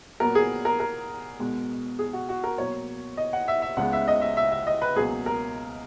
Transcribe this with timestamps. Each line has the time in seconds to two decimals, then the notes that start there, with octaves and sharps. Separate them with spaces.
0.20 A#2 F#3 B3 A#4
0.35 G#4
0.65 A#4
0.80 A#4
1.39 B2 G#3 B3
1.99 G#4
2.13 F#4
2.29 F#4
2.44 A#4
2.58 B2 F#3 A#3 C#5
3.17 D#5
3.33 F#5
3.48 E5
3.62 E5
3.77 C#2 C#3 G#3 B3 F#5
3.93 E5
4.08 D#5
4.21 E5
4.37 E5
4.52 E5
4.67 D#5
4.82 B4
4.96 C#2 B2 F#3 A#3 G#4
5.26 A#4